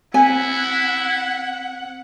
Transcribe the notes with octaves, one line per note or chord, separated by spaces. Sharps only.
C4 E4 F#5 G#5